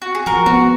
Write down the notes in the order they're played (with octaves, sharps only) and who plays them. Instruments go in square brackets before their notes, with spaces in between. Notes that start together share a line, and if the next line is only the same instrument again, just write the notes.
[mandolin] F#4
G#4
[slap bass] F3 [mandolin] F#4 A#4
[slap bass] B3 [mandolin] F#4